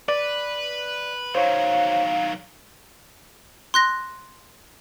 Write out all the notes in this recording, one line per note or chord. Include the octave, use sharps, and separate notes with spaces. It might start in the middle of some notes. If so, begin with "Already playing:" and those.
B4 D5
D#3 F#3 C5 C#5 F5
C6 F#6 A#6